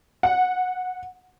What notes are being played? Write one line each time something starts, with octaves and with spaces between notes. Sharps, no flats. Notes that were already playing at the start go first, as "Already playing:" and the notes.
F#5